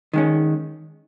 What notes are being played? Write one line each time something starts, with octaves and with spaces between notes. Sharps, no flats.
D#3 G#3 C#4